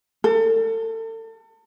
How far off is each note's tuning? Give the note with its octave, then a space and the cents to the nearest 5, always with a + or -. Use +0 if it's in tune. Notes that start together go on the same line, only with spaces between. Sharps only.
A4 +35